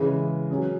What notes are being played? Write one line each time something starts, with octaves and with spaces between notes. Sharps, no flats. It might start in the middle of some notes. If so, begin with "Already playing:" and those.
Already playing: C#3 E3 G#3
F#3 C#4 G#4